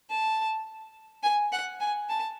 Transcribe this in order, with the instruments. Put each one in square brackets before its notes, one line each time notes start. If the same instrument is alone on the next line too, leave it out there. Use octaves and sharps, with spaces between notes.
[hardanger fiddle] A5
G#5
F#5
G#5
A5